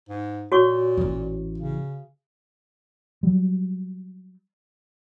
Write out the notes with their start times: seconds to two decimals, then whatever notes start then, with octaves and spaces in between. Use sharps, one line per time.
0.09 G#2
0.52 A#2 F#4 C#5 C#6
0.97 A1 E3
1.58 C#3
3.23 F#3 G3